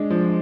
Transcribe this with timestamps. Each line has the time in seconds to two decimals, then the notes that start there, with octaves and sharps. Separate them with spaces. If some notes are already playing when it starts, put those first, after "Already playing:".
Already playing: G#3 D4
0.10 F3